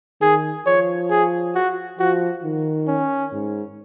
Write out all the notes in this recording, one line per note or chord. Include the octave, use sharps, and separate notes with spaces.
D#3 G#4
F3 C#5
G#4
F#4
F3 F#4
D#3
C#4
G#2